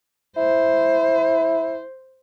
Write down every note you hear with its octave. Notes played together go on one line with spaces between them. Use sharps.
E4 C5